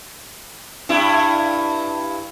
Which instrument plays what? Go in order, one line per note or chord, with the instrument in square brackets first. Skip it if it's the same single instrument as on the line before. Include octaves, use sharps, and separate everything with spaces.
[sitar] G2 E4